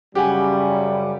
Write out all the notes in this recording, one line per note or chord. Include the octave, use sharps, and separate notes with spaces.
F#2 C#3 G3 G4 F#5 G#5